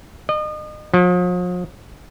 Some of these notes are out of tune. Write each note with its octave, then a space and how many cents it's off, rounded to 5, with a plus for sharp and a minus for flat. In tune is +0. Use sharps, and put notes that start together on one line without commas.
D#5 -35
F3 +45